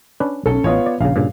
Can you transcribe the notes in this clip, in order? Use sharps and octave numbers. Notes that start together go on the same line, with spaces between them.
C#4 D4 B4
B1 C#4 A4
A1 B3 F4 C#5 D#5
D5
A#1 C#3 F5
G2 A#2 C#3